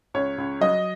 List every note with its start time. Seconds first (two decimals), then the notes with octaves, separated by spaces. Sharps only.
0.14 C#2 C#5
0.38 C#2
0.61 F#3 D#5